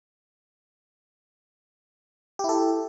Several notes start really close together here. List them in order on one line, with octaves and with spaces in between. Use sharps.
G4 E4 A4